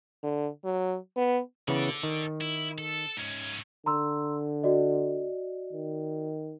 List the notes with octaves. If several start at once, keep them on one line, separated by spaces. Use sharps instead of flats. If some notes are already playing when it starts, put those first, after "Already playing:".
D3
F#3
B3
C#3 E3 B3 A4 D5
D#3
E4
A4
G#2 C#4
D3 A#5 C6 E6
F#4 D5 D#5
D#3